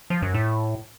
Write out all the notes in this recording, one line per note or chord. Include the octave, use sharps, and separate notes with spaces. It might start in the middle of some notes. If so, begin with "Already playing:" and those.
F3
F#2
A2